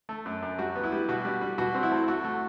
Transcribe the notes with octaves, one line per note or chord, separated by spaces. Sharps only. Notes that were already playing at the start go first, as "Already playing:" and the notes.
A3
F#2
F#2
G3 F#4
B3
E4
G3
B2 F#4
G3
G3
B2 F#4
C4
E4
A3
A3 F#4
A3